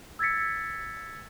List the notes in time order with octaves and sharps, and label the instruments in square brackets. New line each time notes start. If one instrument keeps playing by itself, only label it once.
[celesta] E6 G#6 A6 B6 C#7